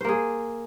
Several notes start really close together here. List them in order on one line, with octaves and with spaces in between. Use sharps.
C5 A#3 G#4